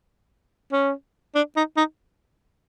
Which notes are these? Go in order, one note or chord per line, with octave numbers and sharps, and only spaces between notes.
C#4
D4
D#4
D#4